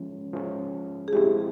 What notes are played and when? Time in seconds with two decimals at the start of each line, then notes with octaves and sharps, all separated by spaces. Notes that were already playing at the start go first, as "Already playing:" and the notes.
Already playing: F3 G#3 C#4
0.33 F3 G#3 C#4
1.08 G#4
1.13 F3 G#3 C4 E4 G4